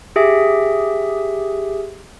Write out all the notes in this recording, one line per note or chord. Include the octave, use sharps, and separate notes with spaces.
G4 G#4 E5